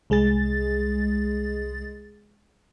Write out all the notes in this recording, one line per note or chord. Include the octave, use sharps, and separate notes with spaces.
C2 G#3 G#4 A6